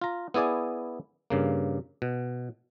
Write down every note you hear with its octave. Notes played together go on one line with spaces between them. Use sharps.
F4 A#5
B3 E4 G#4 D5 G#5
G2 C#3 A#3
B2